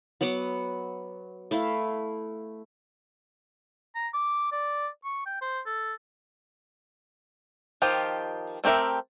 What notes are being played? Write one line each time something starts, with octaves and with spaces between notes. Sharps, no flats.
F#3 B3 F#5 D6
A3 E4 F5
A#5
D6
D5
C#6
G5
C5
A4
D#3 F3 F4 G4
A3 C4 G4 A#4 E5